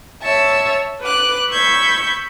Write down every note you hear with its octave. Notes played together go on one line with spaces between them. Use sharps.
C#5 E5 A5 E6
B4 D6 F#6
B5 C#6 E6 G6 G#6